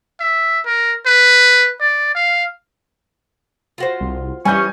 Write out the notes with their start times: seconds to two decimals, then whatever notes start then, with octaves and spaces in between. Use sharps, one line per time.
0.20 E5
0.66 A#4
1.06 B4
1.80 D5
2.15 F5
3.78 F4 F#4 C5
4.01 C2
4.45 E3 G3 C#4 D#4 E4 G#5 C#6 G6